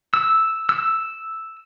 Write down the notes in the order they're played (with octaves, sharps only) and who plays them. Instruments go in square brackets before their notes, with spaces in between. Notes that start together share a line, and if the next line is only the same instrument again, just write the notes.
[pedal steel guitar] E6
E6